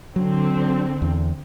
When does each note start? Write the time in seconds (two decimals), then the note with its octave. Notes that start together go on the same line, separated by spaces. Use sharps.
0.16 D3 F#3 C4
1.02 E2